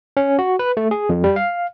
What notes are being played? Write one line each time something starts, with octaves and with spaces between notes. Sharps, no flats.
C#4
F#4
B4
A3
G#4
F2
G3
F5